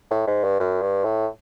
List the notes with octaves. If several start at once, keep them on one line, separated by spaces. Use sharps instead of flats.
A2
G#2
G2
F#2
G2
A2